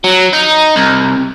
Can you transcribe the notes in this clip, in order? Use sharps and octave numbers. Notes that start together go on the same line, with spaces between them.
F#3
D#4
C2